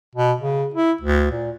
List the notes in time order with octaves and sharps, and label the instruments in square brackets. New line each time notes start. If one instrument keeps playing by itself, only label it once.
[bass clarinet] B2
C#3
E4
D2
A#2